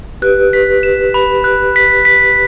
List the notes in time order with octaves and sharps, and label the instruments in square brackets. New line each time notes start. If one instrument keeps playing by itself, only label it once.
[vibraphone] G4 B4 [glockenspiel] F#6
[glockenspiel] B6
E7
B5
F#6
B6
B6